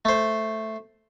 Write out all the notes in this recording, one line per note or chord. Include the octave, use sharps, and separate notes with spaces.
A3 C5